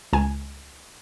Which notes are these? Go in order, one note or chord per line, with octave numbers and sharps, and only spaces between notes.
C#2 G#5